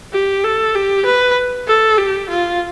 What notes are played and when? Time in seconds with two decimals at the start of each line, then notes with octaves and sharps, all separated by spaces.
0.13 G4
0.44 A4
0.75 G4
1.05 B4
1.67 A4
1.98 G4
2.29 F4